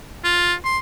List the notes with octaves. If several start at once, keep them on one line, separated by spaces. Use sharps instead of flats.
F4
C6